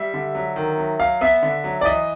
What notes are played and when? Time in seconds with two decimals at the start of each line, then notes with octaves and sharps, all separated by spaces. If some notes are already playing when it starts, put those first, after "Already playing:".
Already playing: G3 E5
0.14 D3
0.35 F#3
0.56 D#3
0.78 F#3
0.99 F#3 F5
1.21 B3 E5
1.43 D3
1.64 F#3
1.81 D5
1.85 E3 D#5